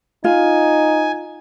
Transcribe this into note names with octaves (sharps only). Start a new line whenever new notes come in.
D#4 F4 G#5